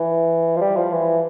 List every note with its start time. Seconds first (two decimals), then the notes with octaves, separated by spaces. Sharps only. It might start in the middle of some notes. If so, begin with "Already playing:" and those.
Already playing: E3
0.56 F3
0.61 G3
0.76 F3
0.92 E3